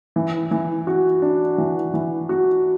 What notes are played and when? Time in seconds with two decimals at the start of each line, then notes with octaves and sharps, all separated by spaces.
0.16 E3
0.51 E3
0.87 F#4
1.22 D4
1.58 E3
1.94 E3
2.29 F#4